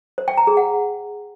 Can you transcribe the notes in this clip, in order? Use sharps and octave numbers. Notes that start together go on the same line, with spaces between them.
C5
G5
A#5
G#4
F#5